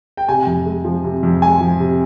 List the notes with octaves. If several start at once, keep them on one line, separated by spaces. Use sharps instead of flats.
G5
C3 G#5
F2
G#3
F3
C3
F2
G#3 G#5
F3
C3